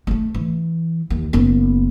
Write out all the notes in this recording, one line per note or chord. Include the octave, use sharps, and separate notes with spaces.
A3 B3
E3
D#2
F#1 B3